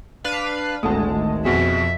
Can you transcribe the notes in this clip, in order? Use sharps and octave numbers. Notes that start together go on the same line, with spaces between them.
D4 B4 F5
G#1 D2 A2 G#3 A4 F#5 A5 D#6
F2 B2 C4 F#4 G#4 E5